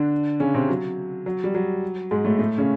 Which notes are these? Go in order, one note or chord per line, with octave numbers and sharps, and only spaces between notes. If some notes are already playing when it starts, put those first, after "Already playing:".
Already playing: D3 D4
C#3 C#4
C3 C4
F#3
F#3
G3
F#3
G#2 G#3
A2 A3
A2 A3
C#3 C#4